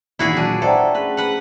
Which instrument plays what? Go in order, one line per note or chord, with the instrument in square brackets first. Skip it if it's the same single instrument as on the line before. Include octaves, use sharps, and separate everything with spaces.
[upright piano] E1 A#2 D#3 [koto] E4 F#4 G#4
[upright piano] A#2 F#3 D#7 [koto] D4
[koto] A4 [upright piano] C5 D5 G5 [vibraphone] E5 F#5 A#5
[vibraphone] A3 C#4 G#4 [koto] B4
[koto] B4 F#5